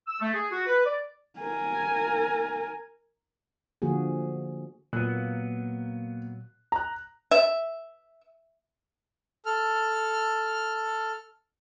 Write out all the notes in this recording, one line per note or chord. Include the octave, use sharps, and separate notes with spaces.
E6
A3
G#4
F#4
B4
D5
A#4 G#5
D3 F3 A#3 F#4 G#4
A#2 F#3 A#3 B3 F#6
A#5 F#6
E5
A4 F6